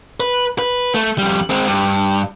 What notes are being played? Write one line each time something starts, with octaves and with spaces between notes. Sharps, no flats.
B4
B4
A3
F2 G3
G#3 C4
G2